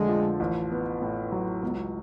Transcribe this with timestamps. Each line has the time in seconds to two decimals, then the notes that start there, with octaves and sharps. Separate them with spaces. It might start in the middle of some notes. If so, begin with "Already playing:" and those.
Already playing: F2 D3 G#3 A3
0.08 F3
0.40 A1
0.71 B3
1.02 A2
1.32 F#3
1.62 C#2 B3